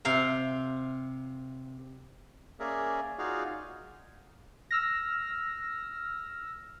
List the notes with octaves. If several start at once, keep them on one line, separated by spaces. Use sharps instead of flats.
C3 F5 A#5
A#3 C#4 G#4 A#4 D5 E5
D#4 F4 F#4 G#4 D5 F5
E6 F6 A#6